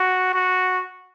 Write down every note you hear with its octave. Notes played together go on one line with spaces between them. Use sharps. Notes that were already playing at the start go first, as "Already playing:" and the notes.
Already playing: F#4
F#4